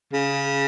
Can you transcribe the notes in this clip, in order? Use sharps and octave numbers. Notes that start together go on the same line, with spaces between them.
C#3